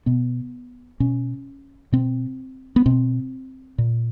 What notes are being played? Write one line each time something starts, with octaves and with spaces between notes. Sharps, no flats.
B2 B3
B2 C#4
B2 C4
B3
B2 C4
A#2